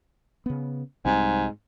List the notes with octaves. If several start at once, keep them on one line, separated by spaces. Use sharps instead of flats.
C#3 B3
C2 G#2 G3 C4